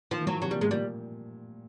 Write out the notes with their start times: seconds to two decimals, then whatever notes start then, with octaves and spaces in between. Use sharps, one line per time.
0.11 D#3 F3
0.21 E3
0.26 F3 F#3
0.42 C3 F#3
0.51 A#2 G3
0.61 A2 G#3
0.71 A#2 G3